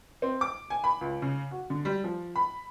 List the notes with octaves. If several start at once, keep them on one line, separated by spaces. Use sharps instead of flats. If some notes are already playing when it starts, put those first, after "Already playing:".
C4
D6
G#5
B5
C#2
C#3
F#4
D3
G3
F3
B5